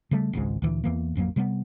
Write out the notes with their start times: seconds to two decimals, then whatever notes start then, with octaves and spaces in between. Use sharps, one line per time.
0.11 C#3 G3 A3
0.33 G#1 C#2 G#2 G#3
0.62 D2 A#2 E3
0.84 E2 E3 A#3
1.15 A1 F2 F#3 A#3
1.36 C3 G3 A3 B3